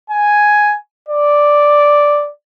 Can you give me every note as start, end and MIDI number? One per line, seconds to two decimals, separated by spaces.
0.10 0.76 80
1.09 2.29 74